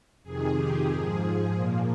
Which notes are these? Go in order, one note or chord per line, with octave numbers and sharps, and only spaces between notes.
F2 C3 D#3 G#4
G4
G#2 F3 G#4
A#2 F3 A#3